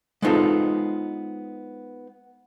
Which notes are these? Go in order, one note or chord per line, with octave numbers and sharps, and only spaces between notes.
G#3 B3 C4 D#4 F4 A4